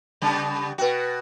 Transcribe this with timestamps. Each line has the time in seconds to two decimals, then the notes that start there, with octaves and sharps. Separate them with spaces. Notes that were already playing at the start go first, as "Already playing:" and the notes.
0.22 C#3 G3 B3
0.78 B2 F#4 B4 G5